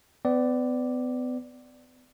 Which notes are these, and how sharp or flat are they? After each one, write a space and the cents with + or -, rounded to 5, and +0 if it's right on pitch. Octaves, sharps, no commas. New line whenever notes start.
B3 +35 D5 +0